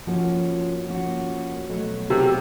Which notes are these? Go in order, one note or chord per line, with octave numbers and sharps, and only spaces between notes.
F3 A#3 C#4 F#4
F3 A#3 C#4 F#4
B2 F#3 A3
C3